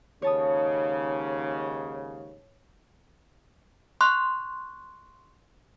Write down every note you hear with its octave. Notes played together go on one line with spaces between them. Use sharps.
D#2 G#2 C#3 C#5 A5 D#6
C6 C#6 F#6